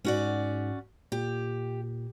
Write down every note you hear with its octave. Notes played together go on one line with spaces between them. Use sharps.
G#2 C#4 F#4 D5
A#2 G4